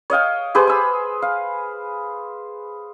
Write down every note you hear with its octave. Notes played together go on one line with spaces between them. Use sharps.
C#5 D#5 F5 G5
G4 G#4 B4 C5
G#5 E6
F5